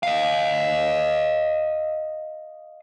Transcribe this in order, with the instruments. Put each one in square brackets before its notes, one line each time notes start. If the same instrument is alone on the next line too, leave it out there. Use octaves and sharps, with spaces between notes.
[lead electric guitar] D#5 F5